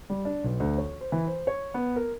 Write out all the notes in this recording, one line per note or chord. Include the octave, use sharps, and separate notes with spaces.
G3
D4
B1
D2
C#5
C5
E3
C5
C#5
B3
A#4